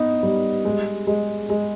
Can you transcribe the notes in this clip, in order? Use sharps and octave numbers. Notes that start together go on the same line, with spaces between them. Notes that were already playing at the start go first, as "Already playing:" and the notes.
Already playing: B3 D#4
G3
G#3
G#3
G#3